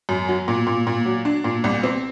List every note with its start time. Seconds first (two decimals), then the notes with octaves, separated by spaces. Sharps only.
0.09 F#2
0.29 F#3
0.48 A#2
0.67 A#2
0.87 A#2
1.05 F#3
1.25 D4
1.44 A#2
1.64 C2
1.83 C4